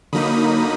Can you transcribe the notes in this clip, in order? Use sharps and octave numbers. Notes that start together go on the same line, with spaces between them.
D3 F#3 A#3 D#4 B5 D#6